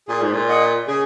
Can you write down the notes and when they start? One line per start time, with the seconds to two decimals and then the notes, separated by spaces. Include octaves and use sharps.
0.08 A#2 G#4
0.21 G#2
0.33 A#2
0.48 D#5 F#5
0.88 C#3 G#4